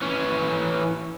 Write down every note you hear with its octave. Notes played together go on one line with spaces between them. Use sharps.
E3 C#4